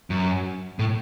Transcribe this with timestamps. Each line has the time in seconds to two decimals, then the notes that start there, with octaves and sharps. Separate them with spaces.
0.10 F#2
0.79 A2